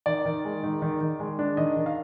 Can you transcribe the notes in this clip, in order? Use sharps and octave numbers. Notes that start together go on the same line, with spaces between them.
D#3 D5
D#3
G#3
D#3
D#3
D#3
G#3
D4
D#3 D#5
D#3
F5